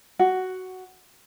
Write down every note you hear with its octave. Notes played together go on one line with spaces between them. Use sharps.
F#4